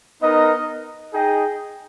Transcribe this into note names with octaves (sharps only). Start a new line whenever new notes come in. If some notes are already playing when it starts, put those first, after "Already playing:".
B3 D#4 A#4 D#5
D#4 G#4 D#5 G5